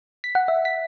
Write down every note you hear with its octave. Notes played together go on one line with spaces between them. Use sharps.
B6
F#5
E5
B6